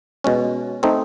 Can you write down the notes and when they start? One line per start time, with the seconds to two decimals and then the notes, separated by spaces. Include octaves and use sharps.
0.24 B2 G#3 C#4
0.83 A3 C4 D#4